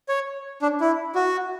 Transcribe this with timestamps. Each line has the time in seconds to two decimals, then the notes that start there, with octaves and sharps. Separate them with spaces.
0.09 C#5
0.62 D4
0.81 E4
1.15 F#4